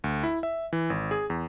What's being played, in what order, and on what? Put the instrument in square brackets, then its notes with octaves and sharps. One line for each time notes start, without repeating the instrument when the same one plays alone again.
[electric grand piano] D2
E4
E5
E3
G#1
G#4
E2